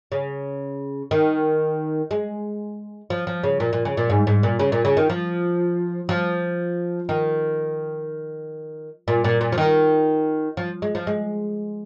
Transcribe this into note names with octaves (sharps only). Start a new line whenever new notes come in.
C#3
D#3
G#3
F3
F3
C#3
A#2
A#2
C#3
A#2
G#2
G#2
A#2
C#3
A#2
C#3
D#3
F3
F3
D#3
A#2
A#2
A#2
F3
D#3
F3
G#3
F3
G#3